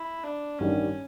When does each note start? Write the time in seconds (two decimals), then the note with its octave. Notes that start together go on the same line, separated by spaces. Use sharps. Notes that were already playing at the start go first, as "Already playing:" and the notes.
Already playing: E4
0.24 D4
0.59 A1 G2 D#3 G3 C#4